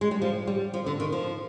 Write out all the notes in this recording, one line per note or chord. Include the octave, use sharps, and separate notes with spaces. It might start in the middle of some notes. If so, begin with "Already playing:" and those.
G#3
G3
F3
G3
F3
D3
D#3
F3